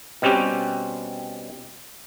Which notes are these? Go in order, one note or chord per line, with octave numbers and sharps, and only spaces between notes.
B2 G3 C4 C#4 G4